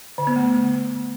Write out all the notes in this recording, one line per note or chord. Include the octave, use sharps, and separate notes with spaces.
D3
B3
A3